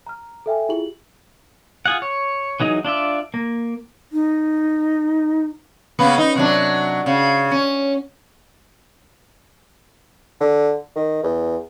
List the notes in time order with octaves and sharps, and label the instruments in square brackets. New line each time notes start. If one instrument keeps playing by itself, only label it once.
[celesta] A#5 F6
A4 E5 G5 G#5
E4 F4 G4 G#4 F#7
[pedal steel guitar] F4 G#4 F#5
C#5
E3 F#3 D#4 G#4
D4 F4 D5 E5
A#3
[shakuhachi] D#4
[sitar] C#3 A#3 B3
D#4
C3 F#3 D4
C#3
C#4
[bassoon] D3
D#3
E2